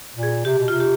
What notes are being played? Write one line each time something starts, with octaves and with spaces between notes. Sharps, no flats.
A#2
G#4
C3 G4
B2
C3 F4
G4